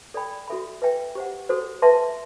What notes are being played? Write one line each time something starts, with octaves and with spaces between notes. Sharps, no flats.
A4 D5 G5 B5
F#4 A4 E5 B5
B4 E5 G5
G4 C5 F#5
F#4 A4 C5
B4 E5 A5 C6